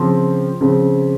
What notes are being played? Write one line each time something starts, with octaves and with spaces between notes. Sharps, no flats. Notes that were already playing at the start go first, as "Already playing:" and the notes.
Already playing: C#3 F3 C4
C#3 F3 C4